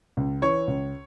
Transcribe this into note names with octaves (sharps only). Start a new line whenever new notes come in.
C#2
E3 C#5 C#6
C#2